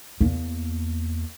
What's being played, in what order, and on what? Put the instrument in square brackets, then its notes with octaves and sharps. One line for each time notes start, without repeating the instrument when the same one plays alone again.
[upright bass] E2 A#3